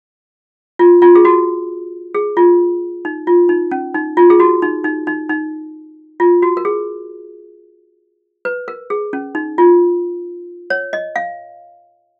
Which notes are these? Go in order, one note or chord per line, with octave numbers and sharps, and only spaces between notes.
F4
F4
G#4
F#4
G#4
F4
D#4
F4
D#4
C#4
D#4
F4
G#4
F#4
D#4
D#4
D#4
D#4
F4
F#4
A#4
G#4
B4
A#4
G#4
C#4
D#4
F4
C#5
D#5
F5